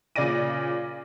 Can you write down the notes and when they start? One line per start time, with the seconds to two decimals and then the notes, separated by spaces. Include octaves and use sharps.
0.16 A#2 C#3 D5 D6 A#6 D#7